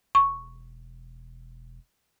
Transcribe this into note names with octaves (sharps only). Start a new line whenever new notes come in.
E1 C#6